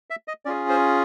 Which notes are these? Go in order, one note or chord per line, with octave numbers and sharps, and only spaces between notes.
E5
D#5
C#4 F4 G#4 D5
C5